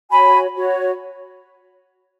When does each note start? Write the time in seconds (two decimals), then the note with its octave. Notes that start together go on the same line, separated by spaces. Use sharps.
0.10 F#4 C#5 G#5 B5
0.55 F#4 C#5